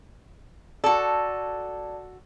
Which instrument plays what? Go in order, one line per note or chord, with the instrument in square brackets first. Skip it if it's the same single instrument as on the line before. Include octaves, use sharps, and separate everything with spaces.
[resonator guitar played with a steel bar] F#4 A4 [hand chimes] D5 A5